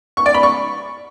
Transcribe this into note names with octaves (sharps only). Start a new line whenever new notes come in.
C#6
D5
B5
C#6